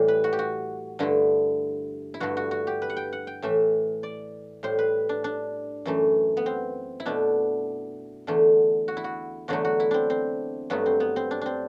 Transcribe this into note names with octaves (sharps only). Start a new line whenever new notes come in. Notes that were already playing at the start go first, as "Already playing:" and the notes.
Already playing: A2 E3 G3 G4
B4
F#4
G4
F#4
G2 D3 A3 E4
E4
G2 D3 A3 F#4
F#4
F#4
G4
B4
F#5
G5
F#5
G5
A2 E3 A3 E5
D5
A2 G3 C5
B4
D4
D4
F#2 E3 A3
B3
C4
E4
B2 A3 D4
E2 D3 A3
F#4
E4
F#4
E2 D3 F#3 A3 F#4
F#4
E4
C4 D4
C4
G2 F#3 A3 B3
C4
B3
C4
D4
C4 D4